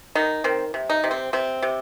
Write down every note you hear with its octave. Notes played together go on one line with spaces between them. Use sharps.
D#3 D#4
D#3 C4
C3
D#4
C3
C4
C3 C4
C3